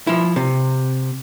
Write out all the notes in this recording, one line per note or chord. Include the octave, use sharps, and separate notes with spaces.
F3 E4
C3